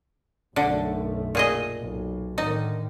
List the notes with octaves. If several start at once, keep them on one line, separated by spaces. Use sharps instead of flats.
B1 F#2 D3 A3
A#2 G#4 D#5
B1
A2 D3 D#3 D#4